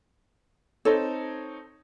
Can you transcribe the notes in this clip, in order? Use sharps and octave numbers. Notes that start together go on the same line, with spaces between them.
C4 D#4 A4 C#5